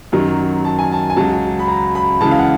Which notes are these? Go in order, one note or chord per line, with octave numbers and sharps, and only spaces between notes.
F#2 D#3 F#3
A5
G#5
A5
G#5
C#2 C#3 F#3 A5
B5
A#5
B5
C#2 C#3 E3 A5
F5
F#5